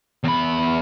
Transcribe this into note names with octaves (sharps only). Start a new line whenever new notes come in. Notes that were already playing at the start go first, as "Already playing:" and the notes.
E2 B5